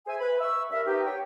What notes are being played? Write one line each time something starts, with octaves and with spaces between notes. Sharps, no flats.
G#4 C5 E5 G#5
B4 B5
E5 C#6 E6
G2 A#4 E5
B3 D#4 G4
C#5 G5